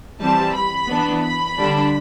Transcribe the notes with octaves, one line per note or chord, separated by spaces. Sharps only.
E3 G3 C4 A5
B5
E3 B3 D4
B5
D3 G3 D4